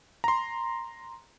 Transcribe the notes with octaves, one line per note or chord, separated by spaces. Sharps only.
A#5 C6